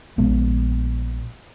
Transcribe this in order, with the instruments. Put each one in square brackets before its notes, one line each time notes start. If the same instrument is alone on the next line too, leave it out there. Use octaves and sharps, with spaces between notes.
[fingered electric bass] A#1 G#3 B3